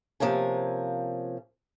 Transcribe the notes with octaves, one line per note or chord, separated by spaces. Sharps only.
C3 F3 A#3 C#4 G#5